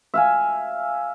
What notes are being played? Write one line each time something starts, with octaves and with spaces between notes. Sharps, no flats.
E5 F5 G#5